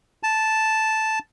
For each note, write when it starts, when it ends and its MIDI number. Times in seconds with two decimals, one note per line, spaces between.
0.23 1.19 81